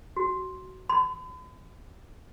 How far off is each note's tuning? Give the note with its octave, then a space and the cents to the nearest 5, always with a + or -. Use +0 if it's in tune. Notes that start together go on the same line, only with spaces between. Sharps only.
F#4 +15
B5 +45